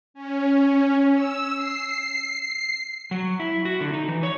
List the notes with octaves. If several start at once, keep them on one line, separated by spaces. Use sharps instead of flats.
C#4
E6
C7
F#3
E4
F#4
D3
D#4
E3
C#5